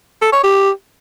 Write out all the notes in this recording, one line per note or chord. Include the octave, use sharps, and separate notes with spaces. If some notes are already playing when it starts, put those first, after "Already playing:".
A4
C#5
G4